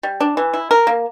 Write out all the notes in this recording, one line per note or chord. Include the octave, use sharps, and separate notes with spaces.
G3
D4
E3
E4
A#4
A#3